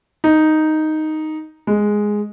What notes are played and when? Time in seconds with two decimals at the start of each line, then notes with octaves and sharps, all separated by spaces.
0.24 D#4
1.67 G#3